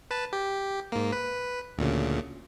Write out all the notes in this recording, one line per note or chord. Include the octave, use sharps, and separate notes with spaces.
B4 A5
G4
G#2 A#3
B4
D2 A#2 C#3